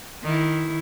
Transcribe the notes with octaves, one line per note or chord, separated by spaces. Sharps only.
D#3 E4